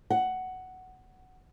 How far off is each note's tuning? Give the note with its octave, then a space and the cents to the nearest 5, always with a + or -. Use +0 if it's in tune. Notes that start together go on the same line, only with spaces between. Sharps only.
F#5 +10